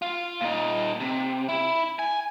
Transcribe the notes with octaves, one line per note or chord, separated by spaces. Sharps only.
F4
A#2 D#4
C3
E4
G#5